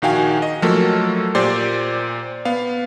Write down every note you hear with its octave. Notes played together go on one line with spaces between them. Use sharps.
A#1 D#3 F#4 F5 G5 G#5
D#5
F3 F#3 A3 A#3 A4 A#4
A#2 G4 C5 D5 C6
B3 F5